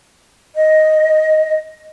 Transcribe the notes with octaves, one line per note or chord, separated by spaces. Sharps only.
D#5